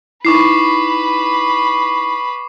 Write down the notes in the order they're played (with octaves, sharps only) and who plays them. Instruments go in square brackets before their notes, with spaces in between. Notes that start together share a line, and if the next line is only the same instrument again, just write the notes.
[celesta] D#4 E4 [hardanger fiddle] B4 B5 [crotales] C#6 D6 C7